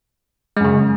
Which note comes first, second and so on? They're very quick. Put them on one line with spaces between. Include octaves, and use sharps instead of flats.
G#3 F#2 C#3